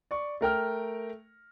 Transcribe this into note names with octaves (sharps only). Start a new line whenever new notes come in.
D5 C#6
A3 A#4 G5 F6